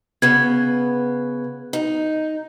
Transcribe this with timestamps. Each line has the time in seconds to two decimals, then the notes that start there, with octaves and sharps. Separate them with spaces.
0.22 C#3 B3 G#6
1.73 D#4